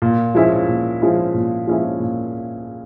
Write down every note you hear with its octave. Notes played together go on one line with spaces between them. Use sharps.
A#2
F3 G#3 C#4 E4
A#2
F3 G#3 C#4 E4
A#2
F3 G#3 C#4 E4
A#2